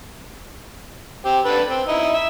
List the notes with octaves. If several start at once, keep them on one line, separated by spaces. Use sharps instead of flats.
C4 G4
D3 B4 A5
C4
D#4 E4
E5